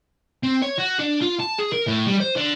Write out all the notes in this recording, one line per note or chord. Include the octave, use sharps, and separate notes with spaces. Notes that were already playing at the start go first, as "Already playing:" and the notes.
C4
C#5
F#4
D4
F4
A5
G#4
A#4
A2
G3
C5
D3